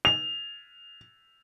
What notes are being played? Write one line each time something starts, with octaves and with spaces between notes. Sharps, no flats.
F7